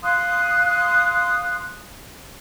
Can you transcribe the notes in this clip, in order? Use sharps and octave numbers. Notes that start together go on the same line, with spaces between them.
F5 C6 D#6 F#6